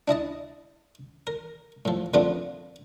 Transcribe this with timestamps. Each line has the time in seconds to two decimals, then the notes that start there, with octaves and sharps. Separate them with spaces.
0.08 D4 E4 D#5 A5
1.27 A#4
1.85 A2 F3
2.14 F2 D3 A3 B3 F4 D5